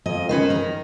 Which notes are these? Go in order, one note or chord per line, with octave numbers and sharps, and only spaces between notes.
F2 D#5
D#3 C#4 B4 C5
A#4